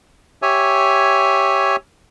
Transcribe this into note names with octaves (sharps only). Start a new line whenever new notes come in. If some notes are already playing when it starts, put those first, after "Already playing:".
G4 C#5 E5 G#5